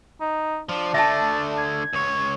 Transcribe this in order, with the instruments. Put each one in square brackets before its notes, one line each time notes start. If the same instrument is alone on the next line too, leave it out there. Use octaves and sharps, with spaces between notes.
[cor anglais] D#4
[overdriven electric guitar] F3 [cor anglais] D4
[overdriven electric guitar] D3 A3 [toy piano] E5 G#5 A5 [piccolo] A6
[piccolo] G#6
[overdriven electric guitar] C#2 C#5